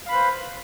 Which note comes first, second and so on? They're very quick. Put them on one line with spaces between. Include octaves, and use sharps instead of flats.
F5 B5 B4 C5